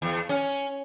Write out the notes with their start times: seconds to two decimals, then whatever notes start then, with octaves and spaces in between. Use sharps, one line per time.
0.02 E2
0.29 C#4